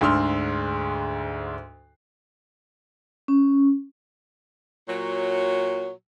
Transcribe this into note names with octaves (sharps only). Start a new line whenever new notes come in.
D2 G#2 D3 C6 E6 F6
C#4
A#2 F#3